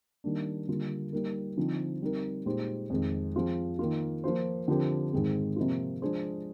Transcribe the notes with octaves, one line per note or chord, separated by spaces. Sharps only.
D#3 G3 A#3 D4
D3 G3 A#3 F4
G3 A#3 D#4 A#4
D3 F3 C4 D#4
G3 C4 D#4 A#4
A#2 G#3 D#4 G4 C5
F2 D#3 G#3
F3 C4 F4 G#4
D#3 A#3 F4
F3 A#3 F4 C5
D3 F3 C4 G4 A#4
G#2 D#3 G#3 C4
C3 F3 A#3 F4
F3 G#3 D4 G#4 C5